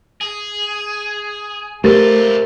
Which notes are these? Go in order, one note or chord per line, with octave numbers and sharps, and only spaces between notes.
G#4
C3 A3 F4 G4 A#4 C5 A6